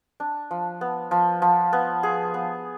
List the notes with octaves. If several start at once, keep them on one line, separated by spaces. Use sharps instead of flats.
D4
F3
B3
F3
F3
B3
G#4
B3